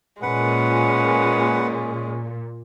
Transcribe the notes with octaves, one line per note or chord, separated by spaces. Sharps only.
A#2 G#3 C#4 B4 F#5